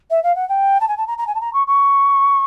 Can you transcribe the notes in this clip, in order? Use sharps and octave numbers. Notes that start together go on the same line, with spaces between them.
E5
F5
F#5
G5
A5
G#5
A5
A#5
A#5
G#5
A5
A#5
C#6
C#6